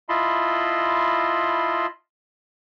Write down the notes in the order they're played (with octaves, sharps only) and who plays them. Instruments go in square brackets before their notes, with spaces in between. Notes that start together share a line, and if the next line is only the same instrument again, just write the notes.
[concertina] E4 F4 D#5 A5 B5 C6